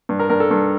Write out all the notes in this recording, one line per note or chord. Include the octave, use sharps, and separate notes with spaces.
G2
A#4
G2 A#4
A4
G2